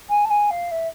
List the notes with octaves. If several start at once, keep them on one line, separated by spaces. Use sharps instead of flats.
G#5
A5
G#5
F5
E5